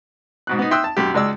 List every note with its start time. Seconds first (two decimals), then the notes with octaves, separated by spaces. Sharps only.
0.47 G#2 B2 F#6
0.59 B3 D#4
0.71 E5 G5 C6 D#6 E6 F#6
0.84 A5
0.97 B1 F#2 G4
1.14 C#2 G#3 D5 E6